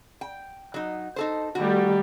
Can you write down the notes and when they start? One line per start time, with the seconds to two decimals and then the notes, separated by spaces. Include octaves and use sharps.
0.21 G5
0.74 F#3 D#4
1.16 D#4 A4 C5
1.55 D#3 G3 A3 F#4